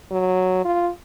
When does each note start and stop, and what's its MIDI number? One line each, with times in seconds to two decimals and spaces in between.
0.12 0.64 54
0.65 0.90 65